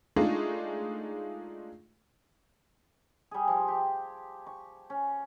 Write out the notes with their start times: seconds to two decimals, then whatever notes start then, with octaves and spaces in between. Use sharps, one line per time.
0.16 G#3 A3 D4 D#4 F4 G#4
3.31 G3 G#4
3.48 F3
3.68 G4
4.46 C#6
4.90 C#4